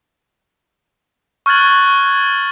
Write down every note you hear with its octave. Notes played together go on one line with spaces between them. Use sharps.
C#6 F6 F#6 G#6 A6 F#7